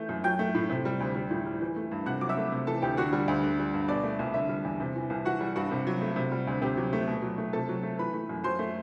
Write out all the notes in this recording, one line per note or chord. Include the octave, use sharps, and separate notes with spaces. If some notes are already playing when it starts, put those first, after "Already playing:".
Already playing: E3 A3 G6
F#2
F#3 G5 G6
A3
A2
C3
G3
D2
G3
A2
G3
E3
A3
G2
C3 F#5 F#6
F#3 D6
E5 E6
A3
C3
E3 A4 A5
D2 G4 G5
D3 F#4 F#5
G3
D2
D3
G3
G2
B2 D5
A3
C2
D3 E5
G3
E2
C3
E3
C2
E3 F#4 F#5
G3
G2 F#4 F#5
C3
F#3
A3
C3
G3
D2
C3 G4 G5
F#3
A3
B2
F#3
A3
C3 A4 A5
F#3
A3
E3 B4 B5
A3
F#2
F#3 C5 C6
A3